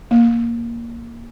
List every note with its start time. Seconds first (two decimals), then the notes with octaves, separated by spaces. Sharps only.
0.11 A#3